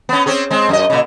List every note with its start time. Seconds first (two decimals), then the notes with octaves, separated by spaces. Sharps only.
0.09 B3 C#4
0.26 C4 C#4 G#4
0.50 G#3 C4
0.69 F#2 D#5
0.90 A#2 C#3